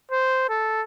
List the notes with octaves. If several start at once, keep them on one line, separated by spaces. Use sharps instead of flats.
C5
A4